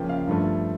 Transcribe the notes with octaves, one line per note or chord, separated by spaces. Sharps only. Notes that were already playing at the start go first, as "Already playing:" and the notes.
Already playing: C#3 F3 A#3 G5
F5
G2 F3 A3